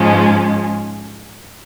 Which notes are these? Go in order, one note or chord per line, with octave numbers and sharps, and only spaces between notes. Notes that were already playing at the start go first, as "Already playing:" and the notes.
Already playing: G#2 F3 G#3 C#4